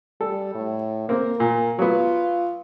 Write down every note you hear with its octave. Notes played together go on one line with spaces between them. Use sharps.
G3 A4
A2
A#3 C4 A#4
A#2 A#4
F#3 B3 F4